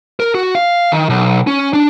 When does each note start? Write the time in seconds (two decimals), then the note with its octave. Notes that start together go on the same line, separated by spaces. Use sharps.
0.20 A#4
0.35 F#4
0.55 F5
0.92 D#3
1.09 B1
1.47 C#4
1.73 D4